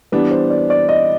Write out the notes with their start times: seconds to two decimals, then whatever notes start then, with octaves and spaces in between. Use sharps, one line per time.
0.12 E3 G3 B3 D4 B4
0.31 C5
0.50 D5
0.70 D5
0.89 D#5